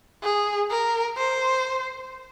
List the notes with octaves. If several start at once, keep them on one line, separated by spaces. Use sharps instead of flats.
G#4
A#4
C5